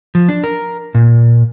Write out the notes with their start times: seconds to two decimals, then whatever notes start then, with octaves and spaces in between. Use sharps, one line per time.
0.15 F3
0.29 D4
0.44 A#4
0.95 A#2